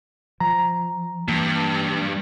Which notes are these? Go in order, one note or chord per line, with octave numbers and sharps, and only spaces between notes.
F3 A#5
G2 E3 A#3